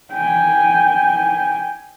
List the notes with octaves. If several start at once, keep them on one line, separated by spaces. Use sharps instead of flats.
G5 G#5